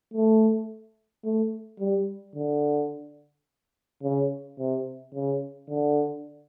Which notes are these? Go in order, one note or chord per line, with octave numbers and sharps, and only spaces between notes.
A3
A3
G3
D3
C#3
C3
C#3
D3